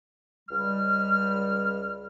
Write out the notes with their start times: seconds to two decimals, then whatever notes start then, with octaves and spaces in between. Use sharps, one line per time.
0.49 C#2 G3 F6